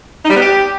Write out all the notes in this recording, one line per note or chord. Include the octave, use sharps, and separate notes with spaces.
D#4
G3
B3
G4